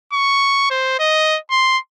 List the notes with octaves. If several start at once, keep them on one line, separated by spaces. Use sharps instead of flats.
C#6
C5
D#5
C6